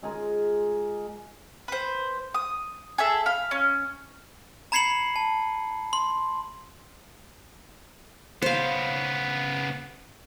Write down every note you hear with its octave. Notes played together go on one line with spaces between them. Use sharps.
G#3 F4 G#4 A#4
B4 C5
D#6
G#4 A4 E5
F5 B5
C#4
A#5 B5 G#6 C7 C#7 F#7
A5
C6
C#3 B3 C5 F5